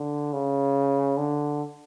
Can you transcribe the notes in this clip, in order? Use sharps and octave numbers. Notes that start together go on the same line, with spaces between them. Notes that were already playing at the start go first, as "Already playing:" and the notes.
Already playing: D3
C#3
D3